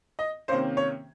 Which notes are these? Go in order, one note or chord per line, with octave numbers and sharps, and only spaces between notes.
D#5
C3 D#3 A#3 C#4 C5
C#5